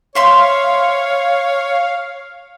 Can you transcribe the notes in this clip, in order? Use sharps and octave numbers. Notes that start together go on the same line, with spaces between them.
C5 C#5 E5 F5 C6